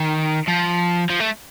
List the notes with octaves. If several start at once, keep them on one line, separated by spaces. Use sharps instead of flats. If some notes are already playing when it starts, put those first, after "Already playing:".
Already playing: D#3
F3
F3
A3